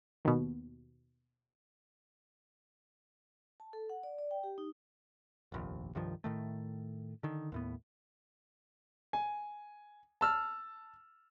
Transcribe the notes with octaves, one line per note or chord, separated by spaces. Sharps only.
D#2 B2
A5
A4
F#5
D5
D5
G5
G4
D#4
F1 A#1 D#2
C2 G2 D#3 F3
A2 D#3 A3
D3 D#3
D#2 A2 B3
G#5
A5 E6 F6